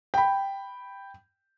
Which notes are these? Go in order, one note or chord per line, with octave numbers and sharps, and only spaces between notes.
G5 B5